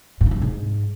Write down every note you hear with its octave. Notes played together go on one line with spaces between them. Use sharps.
A#2
C#3
G2
C3
G#2